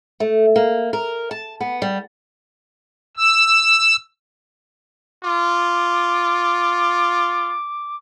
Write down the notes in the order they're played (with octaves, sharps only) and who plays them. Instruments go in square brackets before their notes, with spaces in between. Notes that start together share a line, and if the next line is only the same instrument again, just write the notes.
[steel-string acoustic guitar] A3
A#3
A#4
A5
B3
G3
[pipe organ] E6
[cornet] F4 [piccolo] D6